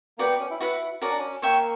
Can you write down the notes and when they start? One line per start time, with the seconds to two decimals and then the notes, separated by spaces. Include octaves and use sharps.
0.18 A#3 F#4 B4 D5 G5
0.29 B3
0.40 C#4
0.50 E4
0.60 E4 F#4 B4 F#5
1.02 C#4 F#4 A#4 D5 A#5
1.11 D4
1.19 C#4
1.42 A#3 C#5 E5 G5 C#6